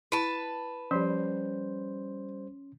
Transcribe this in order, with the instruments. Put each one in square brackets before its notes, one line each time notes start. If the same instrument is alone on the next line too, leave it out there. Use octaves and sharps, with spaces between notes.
[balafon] E4 [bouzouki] B4 A5
[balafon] F3 [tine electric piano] G3 C5 [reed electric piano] C#4 C6